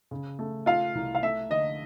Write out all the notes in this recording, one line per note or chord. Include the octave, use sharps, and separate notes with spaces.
C#3
A3
A3 F4 F5
C2
F5
A3 E5
D3 D#5